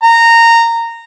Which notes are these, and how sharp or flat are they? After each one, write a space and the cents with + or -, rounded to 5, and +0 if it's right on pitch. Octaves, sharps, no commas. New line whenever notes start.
A#5 -15